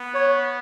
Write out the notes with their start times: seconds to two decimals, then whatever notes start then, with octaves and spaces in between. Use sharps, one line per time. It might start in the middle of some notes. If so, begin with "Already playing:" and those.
Already playing: B3
0.14 C#5